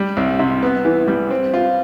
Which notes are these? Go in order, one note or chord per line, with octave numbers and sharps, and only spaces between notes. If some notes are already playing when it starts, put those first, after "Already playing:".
Already playing: G3
C2
C3
B3
E3
G3
C4
F4